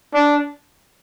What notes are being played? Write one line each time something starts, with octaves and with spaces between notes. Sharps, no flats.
D4